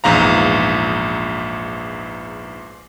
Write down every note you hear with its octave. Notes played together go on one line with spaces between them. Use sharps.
A#1 E2 G#2 F5 A#5